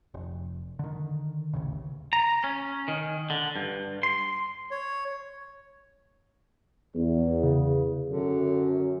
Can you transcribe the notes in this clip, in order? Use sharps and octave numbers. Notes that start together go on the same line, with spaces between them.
F1
D3 D#3
A1 D#2 C#3
A#5
C#4
D#3
D3
G2
C6
C#5
E2
C#3
F#2 D3